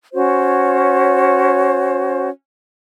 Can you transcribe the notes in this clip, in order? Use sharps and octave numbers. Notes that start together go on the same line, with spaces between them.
C#4 F#4 C5 C#5